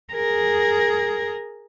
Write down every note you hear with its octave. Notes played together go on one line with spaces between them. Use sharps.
G#4 A#4